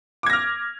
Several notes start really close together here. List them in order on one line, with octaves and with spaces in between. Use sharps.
D6 G#6 A#6 F6